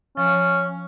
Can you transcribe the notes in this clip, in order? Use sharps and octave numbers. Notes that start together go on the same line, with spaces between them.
F3 C#4